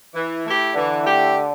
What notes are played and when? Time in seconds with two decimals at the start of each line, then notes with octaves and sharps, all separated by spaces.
0.14 E3
0.44 A3 E4 G4
0.74 D3 E3
1.04 A3 E4 G4